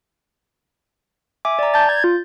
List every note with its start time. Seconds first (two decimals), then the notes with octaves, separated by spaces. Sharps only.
1.45 E5 G#5 D6
1.59 D5 A#5
1.74 A5 G6 A6
1.89 G#6
2.04 F4